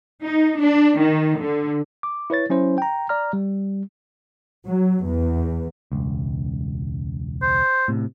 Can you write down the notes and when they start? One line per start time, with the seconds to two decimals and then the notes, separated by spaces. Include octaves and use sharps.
0.24 D#4
0.61 D4
1.01 D#3
1.41 D3
2.03 D6
2.30 E4 B4 C#5 A6
2.50 F#3 C#4 E4 C5
2.78 G5 A#5
3.09 D5 A#5 F6
3.33 G3
4.65 F#3
5.04 E2
5.92 E1 C#2
7.42 C5
7.88 A2 C3